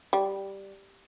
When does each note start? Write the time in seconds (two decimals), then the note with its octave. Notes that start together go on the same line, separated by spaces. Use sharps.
0.13 G3